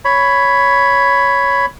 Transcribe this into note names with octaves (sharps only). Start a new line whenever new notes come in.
C#5 B5